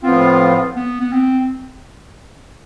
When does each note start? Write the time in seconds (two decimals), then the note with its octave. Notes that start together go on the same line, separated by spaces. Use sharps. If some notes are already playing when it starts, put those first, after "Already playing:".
0.03 A2 F3 B3 C4 F4
0.76 B3
1.01 B3
1.12 C4